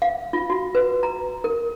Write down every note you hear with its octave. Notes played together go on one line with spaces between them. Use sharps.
F5
F4
F#4
B4
A#5
A#4